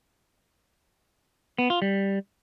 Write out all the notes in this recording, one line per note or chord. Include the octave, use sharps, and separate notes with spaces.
B3
F4
G3